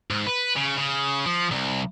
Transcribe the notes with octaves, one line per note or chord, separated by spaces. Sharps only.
G#2
B4
C#3
C#3
F3
C2